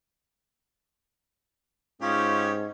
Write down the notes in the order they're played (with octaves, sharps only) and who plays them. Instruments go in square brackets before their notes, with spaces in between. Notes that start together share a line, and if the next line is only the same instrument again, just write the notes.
[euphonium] G#2 [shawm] C#4 [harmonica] D#4 G4 C#5 [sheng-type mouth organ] F4